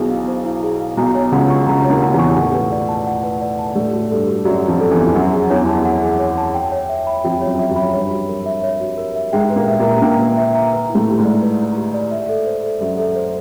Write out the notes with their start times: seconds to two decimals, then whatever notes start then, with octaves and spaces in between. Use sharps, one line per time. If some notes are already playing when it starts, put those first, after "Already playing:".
Already playing: B1 B2 E4 G#4 C5
0.10 F5
0.28 C5
0.45 E4
0.63 G#4
0.80 F5
0.97 B1 B2 A#5
1.15 C#5
1.32 C#2 C#3 F#5
1.50 C#6
1.67 C#2 C#3 A#5
1.84 C#5
1.90 D#2 D#3
2.01 F#5
2.14 E2 E3
2.19 C#6
2.36 A2 A3 F#5
2.54 B4
2.72 D5
2.89 A5
3.07 F#5
3.23 B4
3.41 D5
3.59 A5
3.75 A2 A3 D5
3.93 F#4
4.11 G2 G3 A4
4.28 F#4
4.45 F#2 F#3 D5
4.63 F2 F3 F#4
4.80 A4
4.91 E2 E3
4.98 F#4
5.15 F#2 F#3 F#5
5.33 G#4
5.50 E2 E3 C#5
5.67 A5
5.85 F#5
6.02 G#4
6.19 C#5
6.37 A5
6.54 G5
6.72 C#5
6.89 E5
7.07 B5
7.24 F2 F3 G5
7.42 C#5
7.47 F#2 F#3
7.59 E5
7.70 F#2 F#3
7.76 B5
7.93 G2 G3 C#5
8.11 F#4
8.29 A#4
8.46 E5
8.63 C#5
8.81 F#4
8.98 A#4
9.16 E5
9.33 G#2 G#3 G5
9.50 B4
9.56 A#2 A#3
9.68 E5
9.80 A#2 A#3
9.85 A#5
10.02 A#2 A#3 G5
10.20 B4
10.37 E5
10.55 A#5
10.73 B4
10.89 E4
10.95 A2 A3
11.07 G4
11.18 G#2 G#3
11.25 D5
11.42 B4
11.59 E4
11.77 G4
11.94 D5
12.11 E5
12.29 A4
12.46 C5
12.63 A4
12.80 F#2 F#3 E5
12.98 A4
13.16 C5